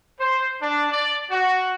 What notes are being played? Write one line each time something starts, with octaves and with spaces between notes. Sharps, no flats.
C5
D4
D5
F#4